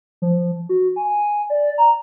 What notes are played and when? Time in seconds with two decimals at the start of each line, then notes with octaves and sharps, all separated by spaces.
0.22 F3
0.69 F#4
0.96 G#5
1.50 D5
1.78 A#5